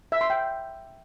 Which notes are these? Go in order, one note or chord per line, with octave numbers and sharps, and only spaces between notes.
E5
C6
G5